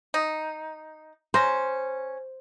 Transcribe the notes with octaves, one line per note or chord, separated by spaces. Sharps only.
D#4
C#4 C5 A#5